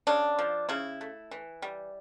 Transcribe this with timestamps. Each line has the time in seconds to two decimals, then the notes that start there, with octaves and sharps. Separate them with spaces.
0.07 C#3 D4
0.39 F3
0.69 C#3 E4
1.01 A3
1.31 E3
1.62 G3